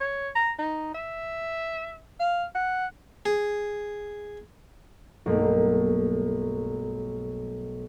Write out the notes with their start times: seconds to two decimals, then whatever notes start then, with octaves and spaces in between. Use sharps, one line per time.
0.01 C#5
0.36 A#5
0.59 D#4
0.94 E5
2.20 F5
2.55 F#5
3.26 G#4
5.26 B1 G2 A3 A#3